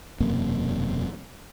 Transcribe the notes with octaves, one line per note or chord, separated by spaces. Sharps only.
E1 F#2 C3 A#3